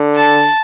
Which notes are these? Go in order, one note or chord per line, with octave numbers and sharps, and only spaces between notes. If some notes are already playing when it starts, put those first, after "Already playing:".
Already playing: D3
A5